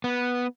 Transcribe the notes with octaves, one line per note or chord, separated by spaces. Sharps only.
B3